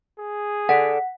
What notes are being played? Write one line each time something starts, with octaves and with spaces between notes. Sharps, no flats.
G#4
A4 D5 F#5